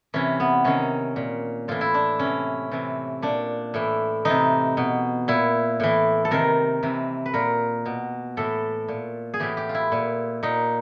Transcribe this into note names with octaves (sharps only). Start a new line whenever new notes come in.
C3 E3 C#4
B3
C3 D#3 C#4
A#2
A2 E3 F4
E4
D4
C3 E3 C#4
C3 E3
A#2 D4
A2 E3
C3 E3 D#4
B2
A#2 E4
A2 E3
A4
C3 D#3 A#4
C3 E3
B4
A#2 A#4
B2
A2 E3 A4
A#2
G#4
A2 E3 G4
G4
F4
E4
A#2
A#2 D#4